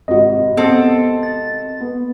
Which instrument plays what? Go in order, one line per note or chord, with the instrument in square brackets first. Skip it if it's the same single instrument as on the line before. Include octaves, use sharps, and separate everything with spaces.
[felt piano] G#1 C3 F#4 [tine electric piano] D#5
[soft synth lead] B3 [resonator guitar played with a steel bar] C4 A4
[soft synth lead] A6
[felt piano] B3